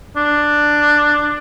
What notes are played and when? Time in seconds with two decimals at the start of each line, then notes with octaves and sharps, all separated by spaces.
0.16 D4